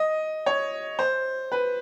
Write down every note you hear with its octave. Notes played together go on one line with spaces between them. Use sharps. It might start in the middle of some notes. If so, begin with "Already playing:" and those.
Already playing: D#5
C#5
C5
B4